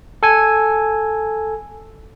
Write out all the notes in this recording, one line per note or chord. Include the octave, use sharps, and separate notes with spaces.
A4 G#5